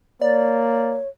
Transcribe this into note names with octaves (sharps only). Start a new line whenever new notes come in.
A#3 C#5 D5